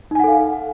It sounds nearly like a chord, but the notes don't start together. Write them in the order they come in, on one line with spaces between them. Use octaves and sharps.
D#4 G#5 F#5 A4 F5